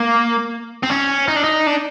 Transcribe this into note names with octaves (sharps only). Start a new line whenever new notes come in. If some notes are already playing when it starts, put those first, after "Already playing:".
Already playing: A#3
C4
C#4
D#4
D4
D#4
D4